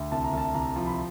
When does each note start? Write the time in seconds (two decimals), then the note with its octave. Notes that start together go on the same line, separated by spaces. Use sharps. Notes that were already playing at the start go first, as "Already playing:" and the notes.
Already playing: D2
0.12 C2 A5
0.24 A#5
0.33 C2 A5
0.55 C2 A#5
0.76 F3
0.86 B5